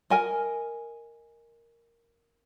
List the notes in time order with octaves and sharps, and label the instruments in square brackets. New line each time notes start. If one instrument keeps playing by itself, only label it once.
[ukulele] A#4 D#5 G#5